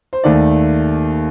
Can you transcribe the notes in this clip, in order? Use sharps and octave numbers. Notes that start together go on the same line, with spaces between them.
C5
D#2 D#3 A3 D5